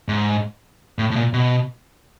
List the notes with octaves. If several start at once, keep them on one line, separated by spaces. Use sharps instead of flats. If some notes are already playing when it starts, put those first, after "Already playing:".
G#2
A2
A2
A#2
B2